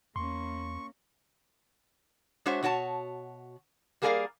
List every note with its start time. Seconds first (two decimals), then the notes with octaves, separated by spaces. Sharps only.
0.16 E2 A#3 C#4 C6 C#6
2.46 G#3 D4 F#4 C5 C#5 E5
2.63 B2 F#4 C#5 A5
4.02 G3 A#3 G#4 A#4 D5 F5